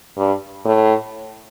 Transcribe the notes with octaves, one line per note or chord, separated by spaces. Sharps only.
G2
A2